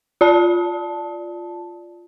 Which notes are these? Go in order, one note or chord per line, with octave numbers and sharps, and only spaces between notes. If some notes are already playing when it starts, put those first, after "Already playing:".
F4 D5 A5